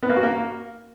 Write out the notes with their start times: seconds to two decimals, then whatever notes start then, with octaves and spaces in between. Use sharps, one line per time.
0.03 B3
0.09 A#3
0.16 F#4
0.23 A#3